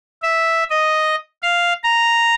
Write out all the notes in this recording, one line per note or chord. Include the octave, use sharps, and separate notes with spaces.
E5
D#5
F5
A#5